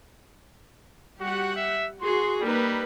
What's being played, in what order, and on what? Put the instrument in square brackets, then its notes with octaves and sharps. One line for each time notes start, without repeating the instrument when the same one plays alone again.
[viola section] G3 G4 F#5 [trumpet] F#4
[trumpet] E5
[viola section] F#4 G#4 [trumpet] C6
[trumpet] G3 [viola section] A#3 D#4 B4